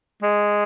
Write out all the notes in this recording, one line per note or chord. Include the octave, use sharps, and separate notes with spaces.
G#3